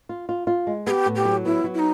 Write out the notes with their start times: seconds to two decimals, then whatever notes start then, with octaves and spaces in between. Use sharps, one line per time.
0.09 F4
0.29 F4
0.47 F4
0.67 G#3
0.87 B3 G4 G#4
1.06 A2
1.16 G4
1.25 F#3
1.45 B3 E4
1.64 F#3
1.74 E4
1.79 D#4